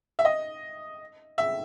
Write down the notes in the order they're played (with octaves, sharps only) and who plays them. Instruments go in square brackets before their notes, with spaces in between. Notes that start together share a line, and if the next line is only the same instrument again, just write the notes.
[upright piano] E5
D#5
E5